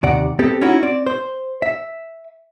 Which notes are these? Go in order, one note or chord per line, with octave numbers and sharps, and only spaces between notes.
D#2 C3 D5 F#5
B3 C4 G4 A4
C#4 D#4 E4 F#4
C4 D5
C5
E5